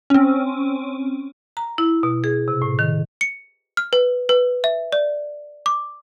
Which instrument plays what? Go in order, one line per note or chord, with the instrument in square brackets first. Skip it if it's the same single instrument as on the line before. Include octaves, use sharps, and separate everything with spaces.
[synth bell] C4 C#4
[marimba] A#5
E4
B2
G#4
C3
A2
D#3
[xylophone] C#7
F6
B4
B4
E5
D5
D6